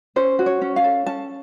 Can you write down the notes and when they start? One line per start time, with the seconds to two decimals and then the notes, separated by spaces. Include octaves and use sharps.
0.16 C#4 C5
0.39 F#4
0.46 C#5
0.62 C#4
0.76 F5
0.84 A4
1.06 C#4 A5